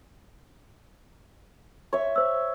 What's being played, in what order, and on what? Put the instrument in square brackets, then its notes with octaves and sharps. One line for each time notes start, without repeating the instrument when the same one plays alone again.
[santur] C#5 E5
[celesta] C5 E6